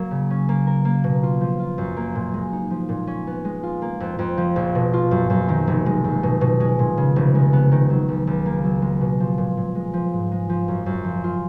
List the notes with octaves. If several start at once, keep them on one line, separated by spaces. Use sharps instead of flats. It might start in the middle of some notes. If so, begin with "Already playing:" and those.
Already playing: F#3 A#3
C#3
C#4
A#3
A#4
A#3
B2
F4
F3
F4
F#2
A#3
A#2
G#3
D#4
F3
A#2
C#4
B3
G#3
F4
A#3
F2
F2
F3
A#1
B2
F4
F#2
F#2
D#3
F1
G#3
F#2
B2
B2
G#3
A#2
C#3
F1
G#3
B3
D#3
F#3
C#2
C#2
A#3
F#3
G#3
B2
F3
A#2
A#2
G#3
F3
G#2
G#3
F3
F#2
F#2
F3
F4